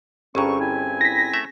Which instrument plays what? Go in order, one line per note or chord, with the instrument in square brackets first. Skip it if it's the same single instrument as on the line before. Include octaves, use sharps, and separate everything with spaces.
[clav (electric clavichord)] G1 G2 [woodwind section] C4 C#6 [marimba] C#4 G#4 A#5
[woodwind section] C4 E4 G#5
[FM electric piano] A#6 B6
[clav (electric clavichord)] A3 E5